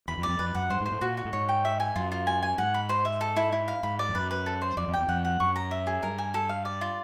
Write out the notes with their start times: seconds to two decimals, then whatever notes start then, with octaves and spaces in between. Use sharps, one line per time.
0.08 E2 B5
0.18 F2
0.23 D5
0.28 F2
0.39 F2 B4
0.55 F#2 F#5
0.70 G2 C5
0.81 G#2
0.86 C5
0.92 A2
1.01 A#2 F#4
1.17 F#4
1.25 A2
1.33 G#2 C#5
1.49 G5
1.65 E5
1.80 G#5
1.96 F#2 F4
2.12 F4
2.27 G#5
2.43 G#5
2.58 G#2 F#5
2.74 B5
2.89 C5
3.05 E5
3.21 A4
3.36 E4
3.53 E4
3.68 F5
3.83 G#2 B5
3.99 D5
4.09 F2
4.15 F#2 B4
4.31 B4
4.46 A4
4.62 C5
4.77 F2 D5
4.88 F2
4.93 E2 G5
5.08 F2 F#5
5.25 F#5
5.40 F#2 C#6
5.56 A#5
5.71 E5
5.87 G#4
6.03 G2 A#4
6.18 G#5
6.34 A4
6.49 F5
6.65 D5
6.81 F4